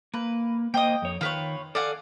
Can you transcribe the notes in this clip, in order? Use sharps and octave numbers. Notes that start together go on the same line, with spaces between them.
A#3 B4
A#3 C5 D#5 G5 D#6
F2 C#5
D#3 F4 B4 C#5 G5
A4 D5 F5 F#5 G#5